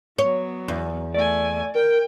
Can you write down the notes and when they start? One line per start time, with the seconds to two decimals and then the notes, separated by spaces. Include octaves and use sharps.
0.18 F#3 B3 C#5
0.68 E2
1.14 A3 D5 G#5
1.75 A#4 G5